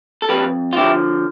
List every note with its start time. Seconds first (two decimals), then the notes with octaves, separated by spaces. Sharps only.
0.22 A4
0.29 F2 G4 B4
0.73 F4
0.77 D3 F3 E4 G4